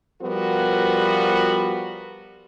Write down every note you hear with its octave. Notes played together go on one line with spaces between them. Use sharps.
F3 G3 B3 F#4 A#4